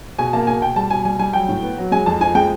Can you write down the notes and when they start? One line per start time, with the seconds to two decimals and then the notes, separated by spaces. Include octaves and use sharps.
0.19 B2 G#5
0.33 A#3 A5
0.47 B2 G#5
0.62 B2 G5
0.76 G3 A5
0.90 B2 G#5
1.05 G3 G#5
1.19 G3 G#5
1.33 F#3 G5
1.48 A2
1.63 B3
1.78 F#3
1.92 G#3 G#5
2.06 F2 A5
2.21 F3 G#5
2.35 G#3 G5